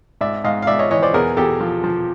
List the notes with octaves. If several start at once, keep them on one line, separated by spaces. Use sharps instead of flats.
G#2 D5 E5
G#2 D#5 F5
F5
G#2 D5 E5
C#5 D#5
E3 C#5 D#5
C5 D5
E2 G#4 A#4
E2 G4 A4
F3
F3